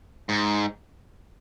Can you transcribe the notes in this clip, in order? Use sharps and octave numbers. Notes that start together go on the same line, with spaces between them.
G#2